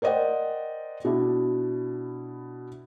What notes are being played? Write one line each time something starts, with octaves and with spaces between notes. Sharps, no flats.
A#4 C5 D5 D#5 F#5 G5
B2 D4 E4